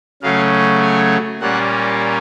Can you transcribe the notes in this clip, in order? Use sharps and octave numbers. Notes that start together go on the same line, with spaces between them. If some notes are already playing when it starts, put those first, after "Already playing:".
C#3 F#3 A3 C#4 F5
G#5
A#2 G3 A#3 C#4 F#5